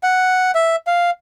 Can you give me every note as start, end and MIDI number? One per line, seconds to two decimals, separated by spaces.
0.03 0.51 78
0.55 0.76 76
0.87 1.10 77